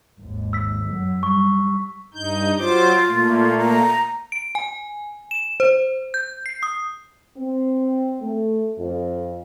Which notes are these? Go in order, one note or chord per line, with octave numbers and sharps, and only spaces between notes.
G#1 D#2
E6 B6
F#2 F#3
G3 C#6
G2 D#4 G6
F#3 F4 C5 D6
A#2 A3 A#3
A#5
D7
G#5
E7
C5
G6
C7
D#6
C4
A3
F2